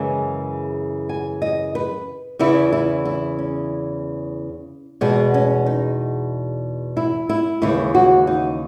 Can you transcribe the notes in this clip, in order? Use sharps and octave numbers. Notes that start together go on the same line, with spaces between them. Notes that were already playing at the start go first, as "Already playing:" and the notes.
Already playing: F#2 C#3 E3 G#3 G#5
G#5
D#5
B4
E2 C#3 E3 E4
E4
E4
C#4
E2 B2 G#3 B3
C#4
D#4
E4
E4
D#2 C#3 E3 G#3 E4
F#4
D#4